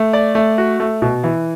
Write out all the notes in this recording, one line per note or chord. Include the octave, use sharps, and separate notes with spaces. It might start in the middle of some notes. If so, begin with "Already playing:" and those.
Already playing: A3
D5
A3
F#4
A3
B2
E3